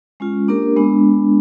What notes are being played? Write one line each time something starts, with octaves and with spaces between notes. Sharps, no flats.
G#3 C#4 F4
A#3 D4 G4 A#4
G#3 B3 D4